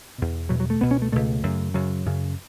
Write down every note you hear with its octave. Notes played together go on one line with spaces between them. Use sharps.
E2 B2
E2 B2 F#3
F#3
A3
C#2 B2 B3
C#4
A3
C#2 B2 A3
F#2 C#3
F#2 C#3 F#3
F#2 C#3